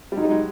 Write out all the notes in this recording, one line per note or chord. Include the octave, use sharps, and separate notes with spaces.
G3
F#3 G#3 D#4
G3
F#3 G#3